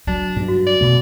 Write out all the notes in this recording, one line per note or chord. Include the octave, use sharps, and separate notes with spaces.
F#3 D4
G2
F#4
D5
B2 A3